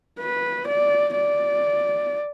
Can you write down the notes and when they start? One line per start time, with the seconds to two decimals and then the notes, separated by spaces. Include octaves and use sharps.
0.20 B4
0.68 D5
1.17 D5